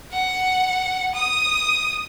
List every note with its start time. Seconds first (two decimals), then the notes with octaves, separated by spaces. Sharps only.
0.12 F#5
1.15 D#6